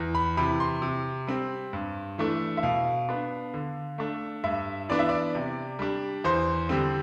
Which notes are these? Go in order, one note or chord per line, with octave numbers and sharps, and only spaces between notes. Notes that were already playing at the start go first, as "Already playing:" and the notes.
Already playing: E2
B5
C3 E3 B5
C6
C3
G3 C4
G2
E3 A3 D4
E5
B2 F5
B3 D4
D3
A3 D4
G2 E5
E3 B3 D4 D5
E5
D5
C3
G3 D4
E2 C5
D3 G3 C4